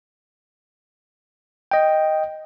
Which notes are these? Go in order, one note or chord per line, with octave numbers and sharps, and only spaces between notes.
D#5 G5